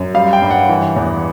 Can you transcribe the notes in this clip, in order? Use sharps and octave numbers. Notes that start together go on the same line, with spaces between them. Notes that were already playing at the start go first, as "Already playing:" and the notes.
Already playing: F#2
G3 F5
G5
G2
F#5
E3
E2